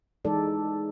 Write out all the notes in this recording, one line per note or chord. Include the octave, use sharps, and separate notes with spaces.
E3 G#3 D#4 A4 D5